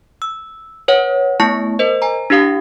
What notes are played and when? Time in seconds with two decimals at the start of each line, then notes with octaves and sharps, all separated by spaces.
0.22 E6
0.88 B4 C#5 F#5
1.40 A3 B3 E4 A5 C#6
1.79 A#4 C5 D#5
2.02 G#5 A#5
2.30 D4 E4 G4 F5 D#6